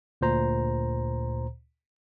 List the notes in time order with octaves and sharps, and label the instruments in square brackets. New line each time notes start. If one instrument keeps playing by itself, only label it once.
[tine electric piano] D2 A#2 C5 A#5